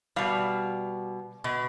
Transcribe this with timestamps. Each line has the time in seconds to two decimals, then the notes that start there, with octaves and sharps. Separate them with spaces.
0.16 B2 G3 F5
1.44 B2